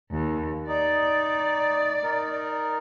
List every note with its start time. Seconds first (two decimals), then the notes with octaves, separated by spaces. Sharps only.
0.11 D#2
0.68 D#4 D5
2.03 D#4 A#4